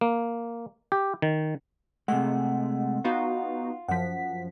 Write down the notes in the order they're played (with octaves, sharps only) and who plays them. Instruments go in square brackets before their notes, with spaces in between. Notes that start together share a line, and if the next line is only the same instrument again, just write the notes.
[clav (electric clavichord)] A#3
G4
D#3
[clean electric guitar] C3 A3 [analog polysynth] G#3 [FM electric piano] F#5
[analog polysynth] B3 D#4 F#4 [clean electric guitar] F4
[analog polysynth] F#2 F3 [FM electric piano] F#5 B6